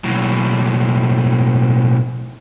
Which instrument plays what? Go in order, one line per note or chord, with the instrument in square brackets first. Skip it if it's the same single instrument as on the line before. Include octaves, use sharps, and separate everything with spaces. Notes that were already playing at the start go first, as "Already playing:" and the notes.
[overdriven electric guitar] B1 A2